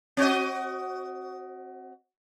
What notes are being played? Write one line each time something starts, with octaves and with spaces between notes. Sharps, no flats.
C4 F#4 D#5